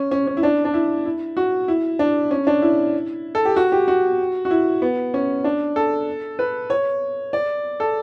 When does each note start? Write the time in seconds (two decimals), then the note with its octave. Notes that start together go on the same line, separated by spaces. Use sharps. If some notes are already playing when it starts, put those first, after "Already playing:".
Already playing: C#4
0.11 C#4
0.27 C#4
0.37 E4
0.43 D4
0.65 D4
0.74 E4
1.06 E4
1.37 F#4
1.68 E4
1.99 D4
2.31 C#4
2.47 D4
2.62 E4
3.35 A4
3.45 G4
3.56 F#4
3.72 G4
3.88 F#4
4.45 F#4
4.51 E4
4.82 B3
5.14 C#4
5.44 D4
5.76 A4
6.39 B4
6.70 C#5
7.33 D5
7.80 A4